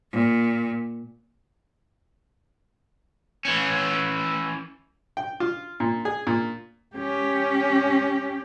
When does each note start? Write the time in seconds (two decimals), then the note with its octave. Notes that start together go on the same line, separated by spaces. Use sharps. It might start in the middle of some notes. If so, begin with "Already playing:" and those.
0.11 A#2
3.45 E3 C#4
5.17 G5
5.40 F4
5.80 A#2
6.05 G#4
6.27 A#2
6.96 C#4 G4